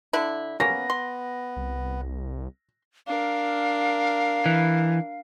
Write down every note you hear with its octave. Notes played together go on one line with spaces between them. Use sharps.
D3 D4 E4
A#3 B3 C#4 A#6
C6
C2
D4 A#4 F5
E3